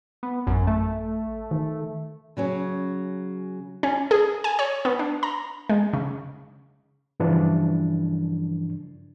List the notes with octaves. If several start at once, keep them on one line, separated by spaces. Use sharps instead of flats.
B3
A1 F#2
A3
D#3
C#3 F#3 C#4
C#4
G#4
G#5
C#5
B3
D4
A#5
G#3
C#3
G2 C#3 E3 F3 D4